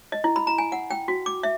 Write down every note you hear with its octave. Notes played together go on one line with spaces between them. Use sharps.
D#5
E4
B5
A#5
G#5
F#5
G5
F#4
D6
E5